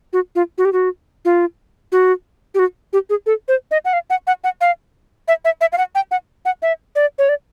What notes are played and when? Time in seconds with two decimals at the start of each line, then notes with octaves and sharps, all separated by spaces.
0.13 F#4
0.35 F4
0.58 F#4
0.65 G4
0.73 F#4
1.25 F4
1.92 F#4
2.54 G4
2.59 F#4
2.93 G4
3.10 G#4
3.26 A4
3.48 C5
3.71 D#5
3.85 F#5
3.93 F5
4.10 F#5
4.27 F#5
4.44 F#5
4.61 F5
5.28 E5
5.45 E5
5.61 E5
5.72 F5
5.78 F#5
5.95 G5
6.11 F#5
6.45 F#5
6.62 E5
6.96 D5
7.18 C#5
7.29 D5